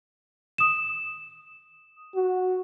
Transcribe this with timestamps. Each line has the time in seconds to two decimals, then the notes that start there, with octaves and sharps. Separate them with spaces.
0.58 D#6 E7
2.15 F#4